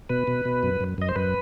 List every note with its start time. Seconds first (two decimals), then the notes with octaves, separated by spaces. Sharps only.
0.09 B2 B4
0.27 B2
0.45 B2
0.63 F#2
0.81 F#2
0.98 F#2 D#5
1.09 C5
1.16 F#2 B4